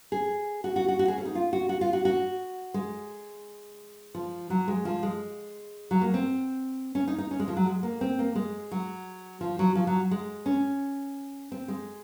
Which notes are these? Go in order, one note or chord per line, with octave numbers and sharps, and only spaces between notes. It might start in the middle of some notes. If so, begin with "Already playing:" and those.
G#4
F#4
F#4
F#4
F#4
G#4
C#4
D#4
F4
F#4
F#4
F4
F#4
F#4
G#3
F3
F#3
G#3
F3
G#3
F#3
A#3
C4
C#4
D#4
D#4
C#4
G#3
F3
F#3
G#3
A#3
C4
A#3
G#3
F#3
F3
F#3
F3
F#3
G#3
C#4
C4
G#3